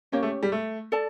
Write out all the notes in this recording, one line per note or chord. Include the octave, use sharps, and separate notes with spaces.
A#3 C#4 G4 C#5
A3
G3
A3
A4 D5 A5